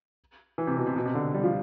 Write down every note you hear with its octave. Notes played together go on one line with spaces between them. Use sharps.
E3
C3
B2
C3
B2
C3
D3
G3
F3